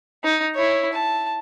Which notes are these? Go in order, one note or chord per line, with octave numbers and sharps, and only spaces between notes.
D#4
E4 C#5
A5